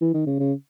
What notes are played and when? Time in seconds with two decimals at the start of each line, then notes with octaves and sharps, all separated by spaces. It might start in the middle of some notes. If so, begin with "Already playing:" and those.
0.01 E3
0.14 D#3
0.26 C#3
0.39 C#3